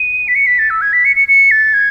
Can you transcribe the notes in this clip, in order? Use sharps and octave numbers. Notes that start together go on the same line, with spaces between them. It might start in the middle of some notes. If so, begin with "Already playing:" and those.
Already playing: D#7
B6
C#7
B6
A6
E6
G#6
B6
C#7
C#7
C#7
A6
G#6